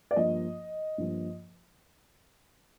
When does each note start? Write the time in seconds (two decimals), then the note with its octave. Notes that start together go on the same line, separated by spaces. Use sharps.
0.11 D5
0.16 G2 F3 A#3 D#5
0.98 G2 F3 A#3